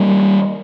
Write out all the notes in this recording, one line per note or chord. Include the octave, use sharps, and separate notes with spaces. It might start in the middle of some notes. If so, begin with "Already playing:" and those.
Already playing: G3 A#3